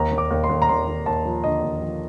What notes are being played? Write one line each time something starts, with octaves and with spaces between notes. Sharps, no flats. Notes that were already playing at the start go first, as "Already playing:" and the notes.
Already playing: D#2 A#5
D#2
D6
D#2
C6
D#2
A#5
D#2 C6
D#2
D#2 A5
F3
D3 D#5
D#2
F3